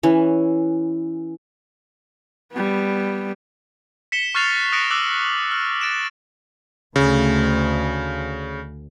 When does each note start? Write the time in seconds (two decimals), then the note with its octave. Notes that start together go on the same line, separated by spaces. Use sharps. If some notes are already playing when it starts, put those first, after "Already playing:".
0.03 E3 C#4
2.52 G3 B3
4.12 B6 C#7 E7 G7
4.35 C#6 F6 F#6 A6 C7 F7
4.72 D#6 F#6 A#6 C#7 D7
4.90 D6 E6 F#6 F#7
5.51 F6
5.81 A6 D7 E7
6.96 D2 C#3